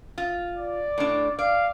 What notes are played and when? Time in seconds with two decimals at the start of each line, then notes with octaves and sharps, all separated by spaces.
0.18 F4
0.56 D5
0.98 A2 D4
1.39 D5 F5